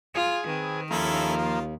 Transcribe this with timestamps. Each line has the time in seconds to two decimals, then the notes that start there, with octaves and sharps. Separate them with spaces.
0.15 F4 G#4
0.47 D#3 C4 B4
0.91 D#2 F3 A#3 C#4 E4 A4
1.37 F4